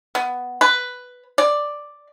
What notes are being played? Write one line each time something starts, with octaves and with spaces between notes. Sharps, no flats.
B3
B4
D5